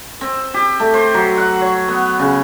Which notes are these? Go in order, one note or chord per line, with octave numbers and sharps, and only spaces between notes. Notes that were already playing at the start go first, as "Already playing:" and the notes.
C4
G4
A3
C5
F#3
F#5
C#5
B3
C#3